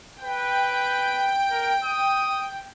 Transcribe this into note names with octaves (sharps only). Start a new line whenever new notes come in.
B4 G5
A#4
D#6